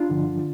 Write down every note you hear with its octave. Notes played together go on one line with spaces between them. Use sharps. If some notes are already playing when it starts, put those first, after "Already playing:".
Already playing: D4 F4
G2 D3 F3